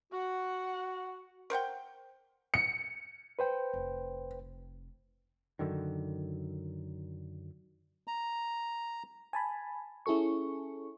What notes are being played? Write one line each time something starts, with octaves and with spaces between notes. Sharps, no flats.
F#4 F#5
A#4 C5 F#5 G5
C#7
B4 C5 G5
F1
F#2 D3 D#3
A#5
G#5 A5 B5
C#4 E4 G#4 A4 C#6